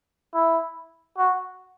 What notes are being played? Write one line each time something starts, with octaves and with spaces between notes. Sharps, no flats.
E4
F#4